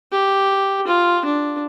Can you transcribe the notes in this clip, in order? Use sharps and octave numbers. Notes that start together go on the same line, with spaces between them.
G4
F4
D4